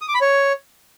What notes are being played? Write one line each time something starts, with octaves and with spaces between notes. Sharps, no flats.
D#6
D6
B5
C#5